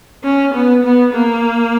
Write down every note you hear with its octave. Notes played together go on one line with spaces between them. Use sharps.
C#4
B3
B3
A#3